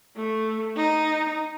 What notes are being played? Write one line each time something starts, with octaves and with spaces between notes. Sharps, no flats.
A3
D#4